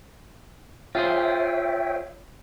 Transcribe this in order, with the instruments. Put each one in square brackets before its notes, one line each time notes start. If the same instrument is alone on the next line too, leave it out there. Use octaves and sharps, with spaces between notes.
[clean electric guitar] F4 G#4 C5 [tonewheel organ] C#5 E5 G5